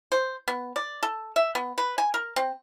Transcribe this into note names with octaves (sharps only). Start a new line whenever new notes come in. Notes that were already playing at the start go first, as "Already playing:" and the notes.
C5
B3
D5
A4
E5
B3
B4
G#5
A#4
C4